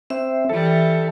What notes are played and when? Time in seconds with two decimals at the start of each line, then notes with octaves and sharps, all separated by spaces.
0.10 C4 E5
0.50 E3 G3 A4